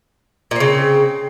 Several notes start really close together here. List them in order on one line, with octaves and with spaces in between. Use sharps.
A#2 C4 C#3